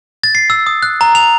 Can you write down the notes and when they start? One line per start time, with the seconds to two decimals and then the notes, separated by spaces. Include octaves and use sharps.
0.24 A6
0.35 C7
0.50 E6
0.67 D#6
0.83 F#6
1.01 A#5
1.15 F7